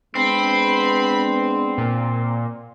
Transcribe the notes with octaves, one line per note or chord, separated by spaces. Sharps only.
G#3 B3 C4 D4 B5 C7
A#2